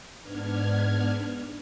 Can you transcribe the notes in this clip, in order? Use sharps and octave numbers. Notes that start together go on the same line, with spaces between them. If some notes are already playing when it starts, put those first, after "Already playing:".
G#2 B3 D4 F6 G#6